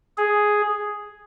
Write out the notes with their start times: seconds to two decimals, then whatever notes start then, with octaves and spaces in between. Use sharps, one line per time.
0.18 G#4